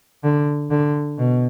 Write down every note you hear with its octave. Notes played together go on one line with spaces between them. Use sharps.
D3
D3
B2